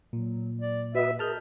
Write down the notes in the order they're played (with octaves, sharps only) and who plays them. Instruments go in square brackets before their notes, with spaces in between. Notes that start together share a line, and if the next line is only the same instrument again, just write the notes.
[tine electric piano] A#2 [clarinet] F#3
[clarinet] D5
[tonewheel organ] F#4 B4 D#5 [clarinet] E5
[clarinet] G#4 [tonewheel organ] A#4 [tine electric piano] A5 F6 G6